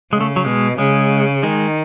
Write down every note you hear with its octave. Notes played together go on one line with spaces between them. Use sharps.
C#3 G#3
A3
F#3
B2 G#3
C#3 G#3
D#3 G#3